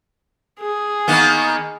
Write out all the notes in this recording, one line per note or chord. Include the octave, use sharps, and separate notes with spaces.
G#4
D#3 A#3 B3